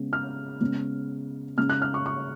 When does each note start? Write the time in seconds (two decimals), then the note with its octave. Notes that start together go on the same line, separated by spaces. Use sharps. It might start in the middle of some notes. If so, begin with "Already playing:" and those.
Already playing: C#3 G#3 B3
0.13 F6
0.61 C#3 G#3 B3
1.58 C#3 G#3 C#4 F6
1.70 F#6
1.82 F6
1.94 C#6
2.06 C#6